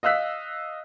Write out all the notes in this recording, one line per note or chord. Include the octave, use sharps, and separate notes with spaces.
D#5 F5 E6 F#6 B6